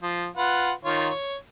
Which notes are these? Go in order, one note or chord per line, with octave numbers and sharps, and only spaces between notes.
F3
F4 B4 F#5
D#3 F4 C#5
C#5